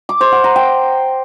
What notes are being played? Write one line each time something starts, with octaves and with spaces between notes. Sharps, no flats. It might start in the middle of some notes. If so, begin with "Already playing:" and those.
D6
C5
F#5
A#5
G5